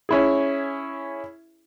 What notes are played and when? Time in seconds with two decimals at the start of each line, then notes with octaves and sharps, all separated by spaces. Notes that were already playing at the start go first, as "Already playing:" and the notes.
0.09 C#4 E4 G#4